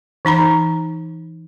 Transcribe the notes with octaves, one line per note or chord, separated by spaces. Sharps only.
E3 D#4 A#5 B5